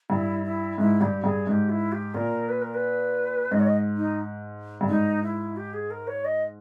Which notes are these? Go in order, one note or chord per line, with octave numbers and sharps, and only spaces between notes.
G2 E4
E4
G#2 E4
G2 G4 G#4
G2 G#4
G#2 G4 G#4
E4
G4
A#2 A#4
B4
A#4
B4
G#2 D#5
C#5
D#5
D#4
G2
G#2 D#4
E4
G4
G#4
A#4
C#5
D#5